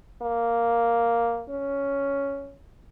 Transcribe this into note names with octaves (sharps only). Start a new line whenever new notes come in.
A#3
C#4